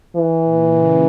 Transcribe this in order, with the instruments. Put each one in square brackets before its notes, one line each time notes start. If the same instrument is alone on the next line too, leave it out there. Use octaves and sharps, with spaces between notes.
[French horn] E3
[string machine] A#2
C#3